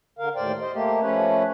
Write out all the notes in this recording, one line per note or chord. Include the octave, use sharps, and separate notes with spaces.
D3 A#4 F5
D#2 A2 C5 D5 G5
C5 D#5
A3 A#3 G4
F3 A3 C#4 B4 C#5